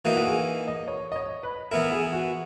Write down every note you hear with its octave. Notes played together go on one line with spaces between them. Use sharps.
E3 A#3 D#4 F#4
F#4
G#4
D#5
C#5
D#5
C#5
B4
E3 B3 E4 A#4
G#4
F#4